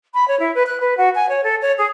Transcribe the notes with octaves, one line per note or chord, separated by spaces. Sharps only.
B5
C#5
E4
B4
F#6
B4
F#4
G#5
C#5
A4
C#5
G#4